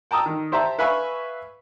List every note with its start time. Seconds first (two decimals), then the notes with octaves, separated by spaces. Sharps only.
0.11 G5 A5 A#5 D#6 E6
0.26 D#3
0.52 G4 C5 E5 A5 A#5
0.79 B4 E5 F5 G#5 B5 C#6